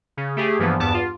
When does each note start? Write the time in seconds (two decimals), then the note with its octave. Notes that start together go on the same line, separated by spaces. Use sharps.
0.17 C#3
0.37 A3 G4 G#4
0.59 G2 E3 F3 A#3 B3
0.80 E2 G2 B3 A5 D6
0.94 F4